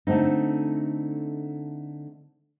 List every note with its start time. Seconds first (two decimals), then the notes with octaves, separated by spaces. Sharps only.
0.07 D3 A3 C4 D#4